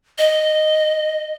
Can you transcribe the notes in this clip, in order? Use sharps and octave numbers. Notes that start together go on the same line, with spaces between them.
D#5